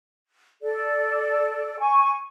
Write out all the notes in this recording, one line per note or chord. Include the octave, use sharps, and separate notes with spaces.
A4 D5
G#5 C#6